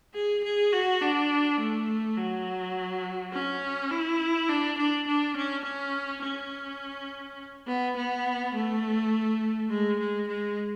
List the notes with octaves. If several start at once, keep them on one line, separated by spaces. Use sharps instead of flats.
G#4
G#4
F#4
D4
A3
F#3
C#4
E4
D4
D4
D4
C#4
C#4
C#4
B3
B3
A3
G#3
G#3
G#3